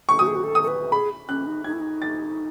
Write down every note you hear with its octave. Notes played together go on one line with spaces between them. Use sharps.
C#6
F#4 D#6
G#4
F#4
A4
D#6
A4
B4
G#4 B5
C#4 F#6
D#4
D#4 G#6
E4
D#4
A6